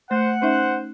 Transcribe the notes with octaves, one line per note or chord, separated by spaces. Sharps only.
A3 C5 F#5
C#4 D#4 C5 E5